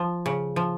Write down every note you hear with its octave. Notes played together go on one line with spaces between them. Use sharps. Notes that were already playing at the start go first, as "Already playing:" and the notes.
Already playing: F3
C#3
F3